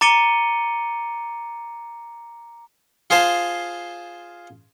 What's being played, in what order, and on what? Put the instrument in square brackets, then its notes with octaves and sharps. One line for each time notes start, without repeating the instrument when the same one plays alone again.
[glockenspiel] A#5 D6 A6 C#7 D#7 G7
[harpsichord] F4 G#4 C5 F5 A5